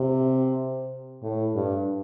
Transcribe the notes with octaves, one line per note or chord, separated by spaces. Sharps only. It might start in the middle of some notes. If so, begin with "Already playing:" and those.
Already playing: C3
A2
G2